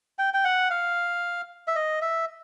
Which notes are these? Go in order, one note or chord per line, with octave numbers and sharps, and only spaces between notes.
G5
G5
F#5
F5
E5
D#5
E5